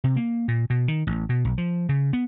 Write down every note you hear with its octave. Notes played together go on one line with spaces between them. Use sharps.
C3
A#3
A#2
B2
D#3
A1
B2
B1
F3
C#3
B3